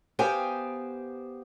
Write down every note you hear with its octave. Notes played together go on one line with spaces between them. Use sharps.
B3 G4 C5 F5 G5 G#5